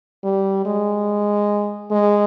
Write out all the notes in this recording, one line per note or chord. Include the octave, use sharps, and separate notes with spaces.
G3
G#3
G#3